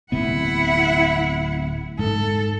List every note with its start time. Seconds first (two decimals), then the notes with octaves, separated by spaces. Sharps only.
0.12 D1 C3 B3 E4 F#5
1.99 G#2 A4